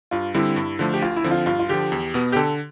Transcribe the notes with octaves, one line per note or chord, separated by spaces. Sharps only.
G2 F4
D3 G3 C4 E4
G2
D3 F3 A3
G4
D2 F4
E4
D3 F3 C4
F4
G2 F4
F4
D3 F3 G4
E2
B2 B3
G4
D3 A4